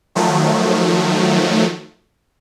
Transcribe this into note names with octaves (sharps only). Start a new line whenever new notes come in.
D#3 F3 F#3 A3